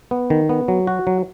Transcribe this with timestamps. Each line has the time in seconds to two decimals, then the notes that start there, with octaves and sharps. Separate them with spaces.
0.11 B3
0.30 D#3
0.49 B3
0.68 F#3
0.87 F#4
1.07 F#3